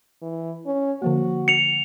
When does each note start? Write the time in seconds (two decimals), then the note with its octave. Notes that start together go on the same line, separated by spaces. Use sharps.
0.22 E3
0.66 C#4
1.02 D3 F3 A#3 F#4
1.48 C#7 F7